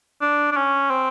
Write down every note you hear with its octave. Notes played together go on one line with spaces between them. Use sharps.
D4
D4
C#4
C4